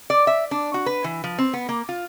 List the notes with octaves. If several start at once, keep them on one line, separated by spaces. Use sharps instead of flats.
D5
E5
D4
F#4
B4
E3
F3
C4
B3
A#3
F4